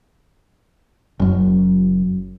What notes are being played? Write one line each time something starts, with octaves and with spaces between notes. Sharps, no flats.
F#1 F#2